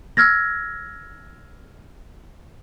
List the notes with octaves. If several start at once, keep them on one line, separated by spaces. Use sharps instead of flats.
E6 F6 G#6 A#6